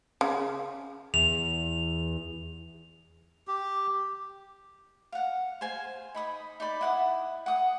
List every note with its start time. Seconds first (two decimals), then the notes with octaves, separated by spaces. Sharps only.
0.21 C#3
1.14 E2 F7
3.48 G4
5.12 F5 F#5
5.61 C5 F5 G#5
6.15 D#4 B5 D#6
6.60 D#4 D5 B5
6.81 E4 F#5 D#6
7.46 F#5 D#6